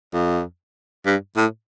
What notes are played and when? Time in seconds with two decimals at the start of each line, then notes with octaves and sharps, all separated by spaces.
0.13 F2
1.06 G2
1.37 A2